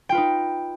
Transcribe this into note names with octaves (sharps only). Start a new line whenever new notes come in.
D#4 F4 B4 G5